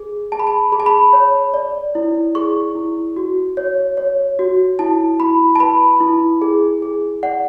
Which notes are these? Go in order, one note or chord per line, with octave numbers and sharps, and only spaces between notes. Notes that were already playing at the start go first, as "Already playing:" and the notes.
Already playing: G#4
G#4 A5
B5
A5
G#4 B5
A5
B5
C#5
D5
E4
G#4 C#6
E4
F#4
C#5
C#5
F#4
E4 A5
E4 B5
A5
B4 B5
E4
G#4
G#4
D5 F#5